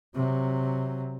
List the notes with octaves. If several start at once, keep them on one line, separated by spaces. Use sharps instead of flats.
C3 F#3